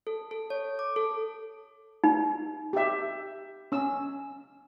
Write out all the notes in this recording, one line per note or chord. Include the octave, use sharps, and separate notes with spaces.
A4
A4
C#5
D6
A4
D#4
G4 E5
C#4 E6